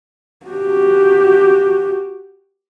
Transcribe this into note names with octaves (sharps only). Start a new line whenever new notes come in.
F#4 G4